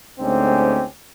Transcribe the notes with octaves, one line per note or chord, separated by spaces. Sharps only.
D2 G#2 C4 C#4 G4